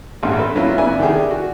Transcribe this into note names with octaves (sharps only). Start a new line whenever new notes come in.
A1 E2 G2
A4 B4
F#3 B3 C#4 E4 F4
F2 B3 D4 E4 G#5
D#3 A3 D4 G4 G#4
F#4